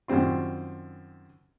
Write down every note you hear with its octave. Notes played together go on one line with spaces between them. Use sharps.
F#2 D#3 G3 C4 F4